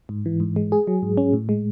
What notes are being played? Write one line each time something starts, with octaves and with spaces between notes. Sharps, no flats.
G#2
E3
G#2
G#3
G#4
F#3
G#2
C#4
A2
G#3